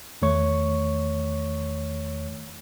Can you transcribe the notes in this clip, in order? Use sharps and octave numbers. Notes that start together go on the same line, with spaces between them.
E2 D#3 A3 C#5 C#6